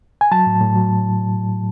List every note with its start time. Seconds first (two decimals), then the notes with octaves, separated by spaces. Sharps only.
0.21 G#5
0.32 F#3 A5
0.46 A2
0.61 A2
0.76 F#3
0.91 F#3